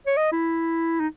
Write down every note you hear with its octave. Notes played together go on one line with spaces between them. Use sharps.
C#5
D#5
E4
D#4